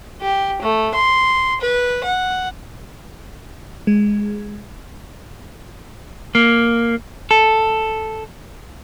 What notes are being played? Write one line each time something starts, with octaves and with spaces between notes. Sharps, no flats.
G4
A3
C6
B4
F#5
G#3
A#3
A4